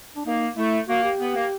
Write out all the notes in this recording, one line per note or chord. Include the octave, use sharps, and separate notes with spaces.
D4
A#3 D#4
A3 E4
A#3 F#4
G4
B3
A#3